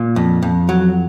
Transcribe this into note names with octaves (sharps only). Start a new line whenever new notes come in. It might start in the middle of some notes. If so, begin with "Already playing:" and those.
Already playing: A#2
F2
F2
F#3